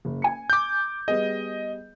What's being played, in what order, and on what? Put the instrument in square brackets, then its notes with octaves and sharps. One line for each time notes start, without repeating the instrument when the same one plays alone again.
[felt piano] F#1
G#5 C#7
[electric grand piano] D6 G6
[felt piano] G3 B3 G#4 [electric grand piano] D#5